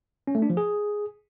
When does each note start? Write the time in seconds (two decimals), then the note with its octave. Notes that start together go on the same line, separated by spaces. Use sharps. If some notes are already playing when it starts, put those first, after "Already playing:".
0.27 C#4
0.35 A3
0.42 D4
0.50 F3
0.57 G#4